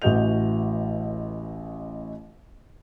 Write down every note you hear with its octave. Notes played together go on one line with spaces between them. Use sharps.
A1 E3 F#4 D#5 G6 F7